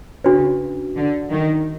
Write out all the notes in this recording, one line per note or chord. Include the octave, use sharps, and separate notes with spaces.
C#3 D4 F#4 B4
D3
D#3